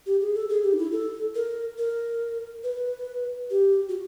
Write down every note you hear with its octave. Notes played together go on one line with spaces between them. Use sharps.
G4
G#4
A4
G#4
G4
D#4
E4
A4
A#4
A#4
B4
G4
F#4